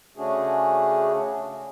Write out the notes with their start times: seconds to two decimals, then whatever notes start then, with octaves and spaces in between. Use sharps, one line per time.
0.17 C#3 A3 C#4 D4 F#4 G#4